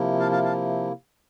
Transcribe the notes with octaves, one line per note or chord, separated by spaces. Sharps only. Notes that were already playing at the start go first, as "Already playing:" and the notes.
Already playing: C3 F3 A#3 E4
F5 A5
F5 A5
F5 A5